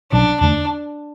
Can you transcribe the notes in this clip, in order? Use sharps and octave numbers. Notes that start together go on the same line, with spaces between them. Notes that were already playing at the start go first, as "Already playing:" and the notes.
B1 B2 F#3 C#4 D4
E2 D3 A3 D4